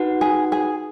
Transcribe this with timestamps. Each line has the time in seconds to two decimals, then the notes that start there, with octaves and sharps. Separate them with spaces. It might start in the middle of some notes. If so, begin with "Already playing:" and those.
Already playing: D#4 F#4 B4 F#5
0.21 G#4
0.52 G#4